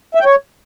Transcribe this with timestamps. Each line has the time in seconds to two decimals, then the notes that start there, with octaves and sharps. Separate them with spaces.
0.15 E5
0.20 G5
0.25 C#5